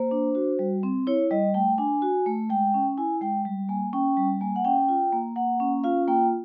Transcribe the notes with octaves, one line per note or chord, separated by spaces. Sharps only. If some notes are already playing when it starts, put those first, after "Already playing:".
Already playing: A#3 C5
D4
F#4
G3
C4
E4 C#5
G3 D#5
A3 G5
D4 G#5
F#4
A3
G#3 G5
C#4
E4 G#5
G#3 G5
G3
A#3 G#5
C#4 G5
G3
A#3 G#5
F#5
C#4 G5
F4
A#3
A#3 F#5
C#4
F4 F5
A#3 G5